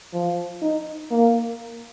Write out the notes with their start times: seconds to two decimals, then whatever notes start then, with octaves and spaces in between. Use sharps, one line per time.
0.13 F3
0.62 D#4
1.11 A#3